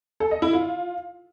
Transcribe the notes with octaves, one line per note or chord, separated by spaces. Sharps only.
A4
D#5
E4
F4